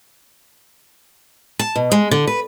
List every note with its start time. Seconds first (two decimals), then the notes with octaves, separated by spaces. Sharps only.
1.59 A5
1.76 B2
1.92 G#3
2.11 D3
2.27 B4